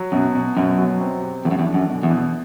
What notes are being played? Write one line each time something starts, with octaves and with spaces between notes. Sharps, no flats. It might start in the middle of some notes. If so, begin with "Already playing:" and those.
Already playing: F#3
F#2 B2
B2
F#2 B2
F#3
C4
G4
E2 A3
F#2
E2
D4
F#2
B2
E2
B2